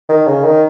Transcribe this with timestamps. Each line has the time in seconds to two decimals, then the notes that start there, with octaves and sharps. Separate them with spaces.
0.09 D#3
0.27 C#3
0.44 D#3